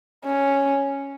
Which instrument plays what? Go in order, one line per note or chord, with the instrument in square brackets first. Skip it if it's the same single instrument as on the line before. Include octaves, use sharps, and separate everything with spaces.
[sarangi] C#4